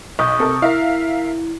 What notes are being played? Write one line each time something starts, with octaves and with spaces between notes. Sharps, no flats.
B1 C#6 D#6 G6
C3 A4 A#4
E4 A#4 E5 F5